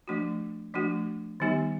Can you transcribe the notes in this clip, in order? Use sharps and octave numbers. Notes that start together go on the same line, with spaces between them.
F3 A3 D4 F#4
F3 A3 D4 F#4
D#3 G3 B3 D#4 G4